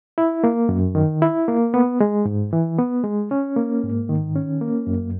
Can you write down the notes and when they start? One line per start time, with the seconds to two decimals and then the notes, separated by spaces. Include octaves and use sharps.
0.18 E4
0.44 A#3
0.69 F#2
0.95 D#3
1.22 E4
1.48 A#3
1.74 B3
2.00 G#3
2.25 G#2
2.53 E3
2.78 B3
3.04 G#3
3.31 C#4
3.57 A#3
3.83 G#2
4.09 D#3
4.35 C#4
4.61 A#3
4.87 F#2